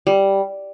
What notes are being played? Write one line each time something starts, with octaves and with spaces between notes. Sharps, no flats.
G3